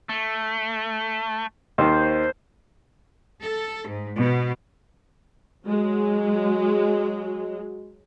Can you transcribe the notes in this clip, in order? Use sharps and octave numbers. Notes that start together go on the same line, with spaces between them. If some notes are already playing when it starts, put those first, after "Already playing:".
A3
D#2 D#3 C5
A4
G#2
B2
F#3 G#3